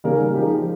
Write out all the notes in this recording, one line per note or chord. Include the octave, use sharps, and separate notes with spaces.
C#3 G3 A#3 D#4 A#4
F3 G#3 D#4 G4